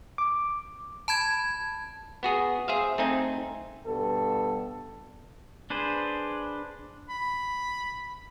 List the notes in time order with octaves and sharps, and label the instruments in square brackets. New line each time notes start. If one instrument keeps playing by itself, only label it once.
[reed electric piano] D6
[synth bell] A5 B5 G#6
[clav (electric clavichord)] B3 F#4 G#4
G#4 C5 E5 F5
A3 C4 D#4 G#5
[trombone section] G2 B2 A4
[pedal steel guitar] D4 G#4 B4 C5
[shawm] B5